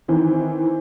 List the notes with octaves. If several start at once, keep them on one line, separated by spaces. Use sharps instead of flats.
D#3 E3 C4